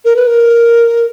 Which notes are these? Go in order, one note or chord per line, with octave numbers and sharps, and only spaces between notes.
A#4
B4
A#4